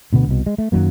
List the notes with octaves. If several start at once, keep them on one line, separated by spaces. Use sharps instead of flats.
D2 B2 D3 B3
C2 B2
G#3
A3
F#2 D#3 F#3 A#3